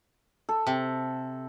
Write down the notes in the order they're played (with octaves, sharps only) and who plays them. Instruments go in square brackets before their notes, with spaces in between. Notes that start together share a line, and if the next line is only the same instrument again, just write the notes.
[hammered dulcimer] A4
[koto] C3